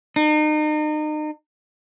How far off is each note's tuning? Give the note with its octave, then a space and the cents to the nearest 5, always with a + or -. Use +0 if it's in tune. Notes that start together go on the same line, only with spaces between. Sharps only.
D#4 -35